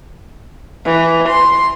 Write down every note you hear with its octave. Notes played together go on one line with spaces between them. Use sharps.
E3
C6